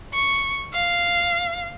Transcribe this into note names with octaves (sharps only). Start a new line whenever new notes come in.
C#6
F5